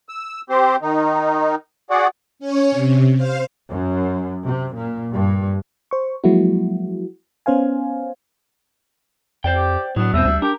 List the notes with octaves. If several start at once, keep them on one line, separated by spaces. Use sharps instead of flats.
E6
C4 G4 C5
D#3 D#4
F#4 G#4 D5 F#5
C#4 C#5
C3
C5 F5
F#2
C3
A#2
G2
C5 C#6
F3 F#3 G#3 A#3 E4 F#4
B3 C#4 C5 F5 G#5
F2 C5 D5 G5
G4
A2 F#3 B3 D4
E2 G2 B2 C4 E5
D2 G3 D4
D4 G4 A#4